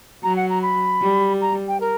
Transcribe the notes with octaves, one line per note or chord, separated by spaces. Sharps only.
F#3 A#5
F#5
A#5
B5
G3
A#5
G5
A#4